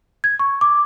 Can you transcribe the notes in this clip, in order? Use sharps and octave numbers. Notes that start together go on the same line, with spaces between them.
G#6
C#6
D6